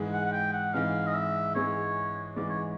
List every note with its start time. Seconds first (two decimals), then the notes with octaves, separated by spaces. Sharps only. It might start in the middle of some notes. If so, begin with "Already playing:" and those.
Already playing: G#2 E3 G#3
0.13 F#5
0.25 F#5
0.33 G5
0.53 F#5
0.73 G#2 E3 G#3 F5
1.07 D#5
1.14 E5
1.55 G#2 E3 G#3 C#5
2.36 G#2 E3 G#3 D5
2.50 C#5